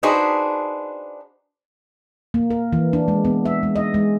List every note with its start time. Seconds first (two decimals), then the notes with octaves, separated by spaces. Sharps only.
0.03 D4 D#4 F#4 G#4 B4 C5
2.34 A#3
2.50 A#4
2.73 E3
2.93 D4
3.08 G#3
3.25 B3
3.45 E5
3.63 G#3
3.76 D#5
3.94 G#3